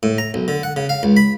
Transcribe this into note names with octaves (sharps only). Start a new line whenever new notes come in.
A2
A#5
B1
D3
F#5
C#3
F5
C#2
B5